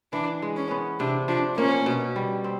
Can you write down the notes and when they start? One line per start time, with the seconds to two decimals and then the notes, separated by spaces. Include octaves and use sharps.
0.13 E3 D4
0.42 G#3
0.57 C#4
0.71 B3
1.00 C3 D4
1.28 F3 D4
1.57 A#3 C#4
1.86 B2
2.16 G3
2.44 C4